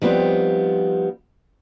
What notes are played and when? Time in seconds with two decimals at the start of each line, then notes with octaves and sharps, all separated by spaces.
0.02 F3 G3 B3 C4 D#4